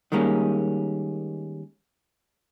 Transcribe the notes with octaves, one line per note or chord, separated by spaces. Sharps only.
D#3 G3 G#3 A#3 C#4